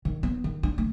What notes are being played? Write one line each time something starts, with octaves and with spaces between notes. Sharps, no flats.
D#3
B3
D#3
D4
A3